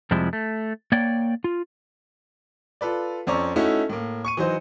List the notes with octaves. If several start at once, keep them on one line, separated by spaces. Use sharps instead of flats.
F2 C3 F3 G3 G#3 E4
A3
A#3 C#5 D5 G5
F4
F4 A4 B4 D5
F2 C4 C#4 D5 A#5 C#6
A3 C#4 D#4 E4 F#4
A2 A#3
C#6 C#7 D#7
E3 F#3 D#4 C5